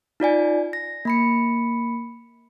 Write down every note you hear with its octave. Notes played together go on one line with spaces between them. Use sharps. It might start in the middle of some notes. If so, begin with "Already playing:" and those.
D#4 F4 D5 G#5
A#6
A#3 B5 C#7